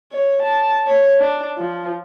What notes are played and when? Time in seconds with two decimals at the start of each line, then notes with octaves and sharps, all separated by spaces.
0.12 C#5
0.42 A5
0.87 C#5
1.19 D4
1.57 F3